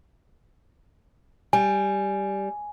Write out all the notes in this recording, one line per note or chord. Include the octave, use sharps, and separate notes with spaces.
G3 G#5